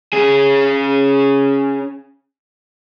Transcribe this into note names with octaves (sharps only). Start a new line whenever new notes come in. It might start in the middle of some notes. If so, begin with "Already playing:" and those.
C#4 G#4